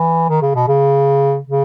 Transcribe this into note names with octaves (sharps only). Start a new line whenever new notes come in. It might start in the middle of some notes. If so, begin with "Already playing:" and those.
Already playing: E3
D#3
C#3
B2
C#3
C#3